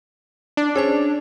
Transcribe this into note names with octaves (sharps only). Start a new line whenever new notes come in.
D4
C#4 G#4 C5 A5